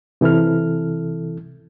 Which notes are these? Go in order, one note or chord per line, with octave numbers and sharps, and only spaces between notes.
C3 E3 E4 A4 F6